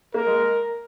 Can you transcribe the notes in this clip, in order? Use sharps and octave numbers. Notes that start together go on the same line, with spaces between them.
A#3 A#4
G#3